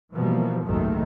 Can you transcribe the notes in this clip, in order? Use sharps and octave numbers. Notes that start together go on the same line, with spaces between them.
B2 E3 F3 G3 A#3
F#1 C2 G#2 D#3 F#3 A3